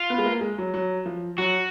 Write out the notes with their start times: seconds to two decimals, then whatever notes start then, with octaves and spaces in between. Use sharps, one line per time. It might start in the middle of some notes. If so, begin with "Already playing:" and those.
Already playing: F4
0.10 B3
0.18 G#3
0.25 A#3
0.41 G#3
0.58 F#3
0.74 F#3
1.06 F3
1.38 F#3 F#4